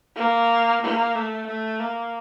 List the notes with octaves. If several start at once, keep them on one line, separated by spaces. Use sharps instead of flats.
A#3
A#3
A3
A3
A#3